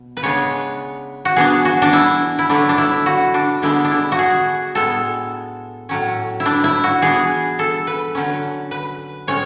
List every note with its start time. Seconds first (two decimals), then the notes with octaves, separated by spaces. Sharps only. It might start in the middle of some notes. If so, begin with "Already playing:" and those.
Already playing: B2
0.17 B4
0.23 C#3 G#3 B3 D4 C#5
1.25 F#4
1.36 E3 B3 D4 G#4
1.65 F#4
1.82 D4
1.93 E4
2.39 E4
2.49 D3 F#3 A3 D4
2.69 D4
2.78 E4
3.06 F#4
3.34 D4
3.62 D3 G#3 B3 D4 E4
3.85 D4
3.91 E4
4.12 F#4
4.19 G#4
4.75 A2 G#3 B3 A4
5.89 A2 F#3 C#4
6.40 E4
6.46 D4
6.64 E4
6.84 F#4
7.02 E3 B3 D4 G#4
7.59 A4
7.87 B4
8.15 D3 F#3 C#4
8.71 B4
9.27 A2 G#3 C#4 C#5